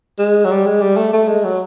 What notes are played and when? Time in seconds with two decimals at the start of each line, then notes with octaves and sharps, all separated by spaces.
0.19 G#3
0.45 F#3
0.51 G3
0.66 G#3
0.81 G3
0.97 A3
1.13 A3
1.28 G#3
1.44 F#3